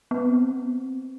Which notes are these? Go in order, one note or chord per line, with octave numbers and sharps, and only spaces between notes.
B3
C4
B3
C4